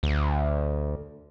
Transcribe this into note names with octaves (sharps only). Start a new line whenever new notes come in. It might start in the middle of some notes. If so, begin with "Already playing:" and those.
D2